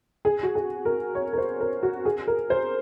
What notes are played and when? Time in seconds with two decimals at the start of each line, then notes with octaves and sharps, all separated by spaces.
0.25 G#4
0.43 F#4
0.55 G#4
0.85 A#4
1.15 C#5
1.33 A#4
1.38 C5
1.60 A#4
1.83 F#4
2.05 G#4
2.27 A#4
2.50 C5